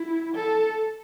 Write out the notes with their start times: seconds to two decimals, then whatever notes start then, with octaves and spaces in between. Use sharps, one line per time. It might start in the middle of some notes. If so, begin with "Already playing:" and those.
Already playing: E4
0.35 A4